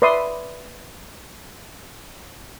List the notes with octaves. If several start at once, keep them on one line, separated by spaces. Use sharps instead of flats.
B4 D5 E5 C6 D#6